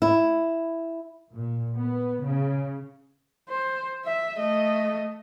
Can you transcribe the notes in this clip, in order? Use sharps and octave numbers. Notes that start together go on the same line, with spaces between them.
E4
A#2
B3
C#3
C5
E5
A3 D#5